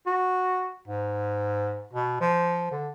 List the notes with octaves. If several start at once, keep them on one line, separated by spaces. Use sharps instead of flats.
F#4
G#2
B2
F3
D3